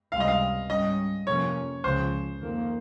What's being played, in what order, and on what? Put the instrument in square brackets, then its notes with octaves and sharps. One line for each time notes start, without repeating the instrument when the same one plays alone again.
[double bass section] C#2 C3 G3 C4 [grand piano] F5
[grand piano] D#5
F5
[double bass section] G#2 G3 C#4 [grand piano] D#5
[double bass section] F2 C3 F3 A#3 C#4 [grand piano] C#5
[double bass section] C#2 C#3 F3 [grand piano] C5
[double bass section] F2 D#3 A#3